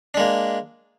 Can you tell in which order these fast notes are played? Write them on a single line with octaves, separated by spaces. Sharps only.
D4 G#3 A#3